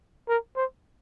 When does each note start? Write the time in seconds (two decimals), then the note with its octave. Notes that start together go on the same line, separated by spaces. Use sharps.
0.29 A#4
0.56 C5